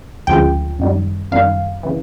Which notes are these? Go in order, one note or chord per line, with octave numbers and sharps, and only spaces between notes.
D2 C#3 F3 G#3 G5
F#2 D#3 G3
F#2 D#3 G3 F5
C#3 E3